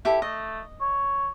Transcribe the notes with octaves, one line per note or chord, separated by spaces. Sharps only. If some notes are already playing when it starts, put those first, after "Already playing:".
E4 G4 A4
A3 D#5
C#5